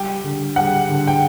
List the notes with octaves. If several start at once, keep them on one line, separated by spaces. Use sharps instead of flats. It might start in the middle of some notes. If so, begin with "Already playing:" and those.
Already playing: G3 G5
D3
G3 F#5
D3
G5